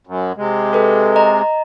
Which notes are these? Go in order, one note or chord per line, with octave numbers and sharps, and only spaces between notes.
F#2
C3 G#3
A4 B4
D#5 A#5